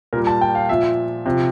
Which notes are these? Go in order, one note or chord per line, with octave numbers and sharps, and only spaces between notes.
A#2 G3 A#4
A5
G5
F5
A#2 F3 E5
C3 F3